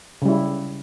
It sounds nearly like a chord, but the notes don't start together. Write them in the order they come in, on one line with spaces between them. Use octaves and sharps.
C#3 G3 E4